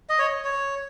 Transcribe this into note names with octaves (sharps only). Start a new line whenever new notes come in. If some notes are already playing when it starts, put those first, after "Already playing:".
D#5
C#5
C#5